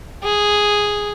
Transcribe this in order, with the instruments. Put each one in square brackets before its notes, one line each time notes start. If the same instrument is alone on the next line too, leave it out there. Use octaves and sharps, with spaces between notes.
[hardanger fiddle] G#4